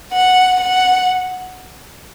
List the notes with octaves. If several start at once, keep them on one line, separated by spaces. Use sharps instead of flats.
F#5
F#5